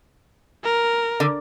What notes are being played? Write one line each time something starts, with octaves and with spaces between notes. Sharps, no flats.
A#4
D3